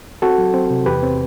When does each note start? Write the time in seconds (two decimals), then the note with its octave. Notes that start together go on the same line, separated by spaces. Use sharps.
0.22 C4 F#4 A4
0.38 F#3
0.54 C4
0.70 C3
0.86 E2 G4 B4
1.03 C4